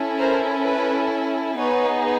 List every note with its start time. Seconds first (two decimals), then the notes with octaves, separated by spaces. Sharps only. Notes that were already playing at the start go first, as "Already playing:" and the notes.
Already playing: C#4 E4 A4
0.19 A#4 C5
0.65 B4
1.57 B3 D#4 G#4 B4 C#5